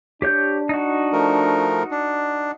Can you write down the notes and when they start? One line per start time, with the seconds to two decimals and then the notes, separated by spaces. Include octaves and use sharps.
0.22 D4 G4 C#5 G6
0.69 D#4 F#4
1.13 F3 A3 A#4
1.91 D4